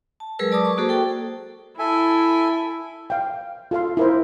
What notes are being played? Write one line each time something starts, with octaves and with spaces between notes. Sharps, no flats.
A5
F#3 G#3 G#4 A#4 B4 E6
D5 A5 D6 D#6
C#6
A#3 F#4 G#4 A4 C5
A4 G5
E4 A4 E5 G#5
F5 G5
F4 A4 F5 C6
E4 A#4 C5